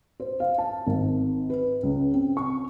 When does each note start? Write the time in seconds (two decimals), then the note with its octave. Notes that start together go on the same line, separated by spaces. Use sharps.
0.20 C5
0.40 F5
0.58 A5
0.87 G#1
1.50 B4
1.83 C#2
2.14 C4
2.37 C#6